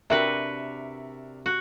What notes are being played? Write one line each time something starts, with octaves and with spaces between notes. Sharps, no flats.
C3 D4 F#4 A#4 B4 E5
F#4